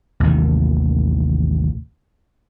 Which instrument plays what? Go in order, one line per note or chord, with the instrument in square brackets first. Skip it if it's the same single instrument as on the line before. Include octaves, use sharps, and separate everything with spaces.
[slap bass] A1 D#2 C3 D#3